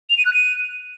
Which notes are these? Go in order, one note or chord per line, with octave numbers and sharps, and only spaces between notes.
F7
D#7
F#6
D#7